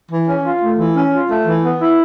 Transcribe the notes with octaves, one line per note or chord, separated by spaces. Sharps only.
E3
C#4
F4
A3
E3
C#4
F4
A3
E3
B3
E4